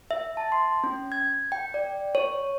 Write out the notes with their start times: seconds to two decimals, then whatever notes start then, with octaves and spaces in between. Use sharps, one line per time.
0.11 E5
0.37 A5
0.52 C6
0.84 C#4
1.12 G#6
1.52 G5
1.74 D5
2.15 C#5